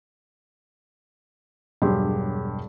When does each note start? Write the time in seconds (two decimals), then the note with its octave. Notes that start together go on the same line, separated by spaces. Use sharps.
1.82 E1 G2 F#3 G4 G#4 C6